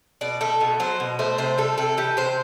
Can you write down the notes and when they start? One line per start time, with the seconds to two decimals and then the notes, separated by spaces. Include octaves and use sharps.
0.21 B2 D5
0.41 A3 A4
0.61 B2
0.80 F#3 C5
1.00 B2
1.19 A3 C5
1.38 C3 C5
1.58 G3 A4
1.78 C3 A4
1.97 E3 G4
2.17 C3 C5